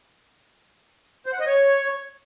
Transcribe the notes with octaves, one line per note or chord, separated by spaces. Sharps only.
C5
F#5
D#5
C#5